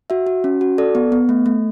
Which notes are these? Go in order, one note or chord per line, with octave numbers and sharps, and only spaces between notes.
F#4 E5
F#4
C#4
F#4
A4 D5
B3
B3
A3
A3